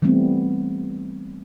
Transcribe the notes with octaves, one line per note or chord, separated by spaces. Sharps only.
E3 G3 A3 B3 C4